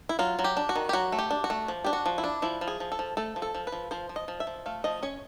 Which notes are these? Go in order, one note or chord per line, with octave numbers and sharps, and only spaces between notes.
E4
F#3 F4
F#3
G4
D4
F#4
D#3
G4
F#3 F#4
A3
G4
D4
F#4
A3
F3
D4 G4
F#4
F3
E4
D4
F3 E4
F3
G#4
F3
A4
F3
A3 A4
F3
A4
F3
B4
F3
F3 C5
F3
D#5
F3
E5
F3
A3 F5
F3 D#5
C#4 C#5